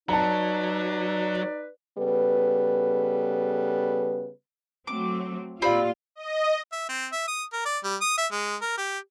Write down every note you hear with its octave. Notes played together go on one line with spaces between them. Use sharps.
F#3 D#4 B4 D5 A5 A#5
C#3 G3 B3 A4 B4
F#3 A3 C4 D6
A#2 C4 F4 G4 D5 F5 B5
D#5
E5
C4
E5
D#6
A#4
D5
G3
D#6
E5
G#3
A#4
G4